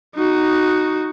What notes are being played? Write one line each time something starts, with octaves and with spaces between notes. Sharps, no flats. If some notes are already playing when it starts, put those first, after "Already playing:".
D#4 F#4